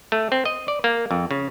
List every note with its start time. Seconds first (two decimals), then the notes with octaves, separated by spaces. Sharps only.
0.12 A3
0.32 C4
0.45 D#5
0.68 D5
0.84 A#3
1.11 F2
1.31 C#3